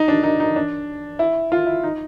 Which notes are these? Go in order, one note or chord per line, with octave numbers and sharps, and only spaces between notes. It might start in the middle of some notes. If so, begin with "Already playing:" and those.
Already playing: D#4
D4
D#4
D#4
D4
E4
F4
E4
D#4